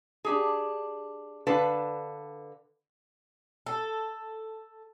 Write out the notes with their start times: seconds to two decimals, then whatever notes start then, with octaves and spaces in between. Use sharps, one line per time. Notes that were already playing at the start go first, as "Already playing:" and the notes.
0.25 D4 G4 G#4
1.47 D3 B4 F5 A5
3.66 A4